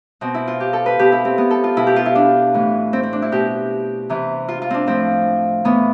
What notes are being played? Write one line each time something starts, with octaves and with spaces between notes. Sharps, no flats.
B2 C4
E4
F4
G4
A4
B4
B2 G4
E4
C4
B3
A4
F4
B2 E4
G4
F4
E4
D4
A2 E3
C4
C4
D4
E4
B2 G4
C3 E3
F4
F4
C4 D4
A2 F3 C4
A2 E3 B3